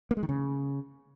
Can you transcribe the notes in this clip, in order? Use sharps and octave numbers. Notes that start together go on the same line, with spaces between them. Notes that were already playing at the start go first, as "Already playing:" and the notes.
A#3
G#3
D#3
C#3